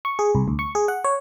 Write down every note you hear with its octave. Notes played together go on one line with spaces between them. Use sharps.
C#6
G#4
C2
D2
C#6
G#4
F#5
C#5